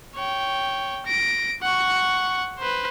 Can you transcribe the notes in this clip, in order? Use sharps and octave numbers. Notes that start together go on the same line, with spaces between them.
C#5 G5
A#6 D7
F#5 C#6
B4 C5